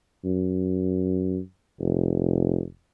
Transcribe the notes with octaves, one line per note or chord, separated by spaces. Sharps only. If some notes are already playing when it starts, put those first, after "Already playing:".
F#2
F1